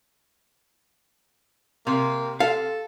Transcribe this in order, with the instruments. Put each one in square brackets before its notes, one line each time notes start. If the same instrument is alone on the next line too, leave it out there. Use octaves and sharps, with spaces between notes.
[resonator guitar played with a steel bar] C3 [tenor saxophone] A#3
[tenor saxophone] A4 [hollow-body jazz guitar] F5